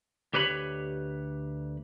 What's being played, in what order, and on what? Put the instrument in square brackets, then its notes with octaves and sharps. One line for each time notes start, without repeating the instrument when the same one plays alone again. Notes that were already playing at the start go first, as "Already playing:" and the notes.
[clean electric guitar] D2 G4 B4 C#5 B5